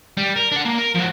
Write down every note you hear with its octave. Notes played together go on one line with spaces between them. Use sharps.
G3
A#4
D4 F#5
A#3
A#4
F3 F#4